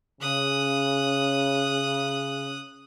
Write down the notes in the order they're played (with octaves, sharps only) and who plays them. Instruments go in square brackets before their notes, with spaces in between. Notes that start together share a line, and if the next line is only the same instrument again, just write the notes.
[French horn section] C#3 [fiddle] D#6 F#6